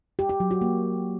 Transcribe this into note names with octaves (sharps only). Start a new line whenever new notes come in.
G4
G4
F#3
F#4
A#3